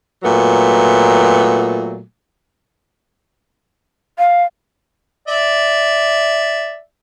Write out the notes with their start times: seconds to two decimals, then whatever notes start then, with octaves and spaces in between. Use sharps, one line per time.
0.23 A#2 F#3 A3 B3
4.19 F5
5.28 D5 E5